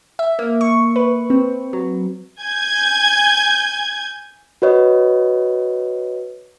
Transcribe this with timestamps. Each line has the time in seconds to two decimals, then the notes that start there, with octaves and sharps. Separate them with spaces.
0.19 E5
0.39 A#3
0.61 C#6
0.96 B4
1.30 C4
1.73 F#3
2.41 G#5 G6 G#6
4.62 F#4 B4 C#5 D#5